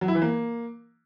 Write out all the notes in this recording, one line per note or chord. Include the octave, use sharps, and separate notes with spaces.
F#3
E4
E3
A#3